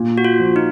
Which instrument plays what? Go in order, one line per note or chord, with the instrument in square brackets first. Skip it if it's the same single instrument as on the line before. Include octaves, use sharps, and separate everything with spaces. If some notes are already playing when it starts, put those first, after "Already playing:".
Already playing: [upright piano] A#2
[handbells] F#4
F4
[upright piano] F3
[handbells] D#4